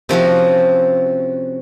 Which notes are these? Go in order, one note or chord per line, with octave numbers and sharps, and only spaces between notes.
C3 F3 C#4 F#4